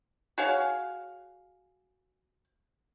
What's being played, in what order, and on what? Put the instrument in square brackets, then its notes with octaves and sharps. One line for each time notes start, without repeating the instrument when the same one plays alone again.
[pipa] F#4 G#4 C#5 F5